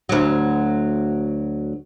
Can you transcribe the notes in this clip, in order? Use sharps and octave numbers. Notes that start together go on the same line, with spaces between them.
D2 F#3